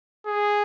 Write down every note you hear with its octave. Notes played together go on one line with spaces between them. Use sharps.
G#4